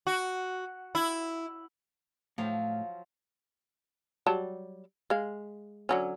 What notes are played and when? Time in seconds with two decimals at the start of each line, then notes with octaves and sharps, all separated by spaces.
0.07 F#4
0.95 E4
2.38 A2 F3 F#3 F5
4.26 F#3 G3 A5
5.10 G#3 F5
5.89 D3 F#3 C#4